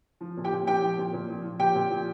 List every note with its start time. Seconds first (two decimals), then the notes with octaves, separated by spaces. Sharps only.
0.21 F3
0.37 A#2
0.44 G4 G5
0.52 A#2
0.67 F3 G4 G5
0.82 F3
0.98 A#2
1.13 A#2
1.28 F3
1.44 F3
1.59 A#2 G4 G5
1.75 A#2
1.91 F3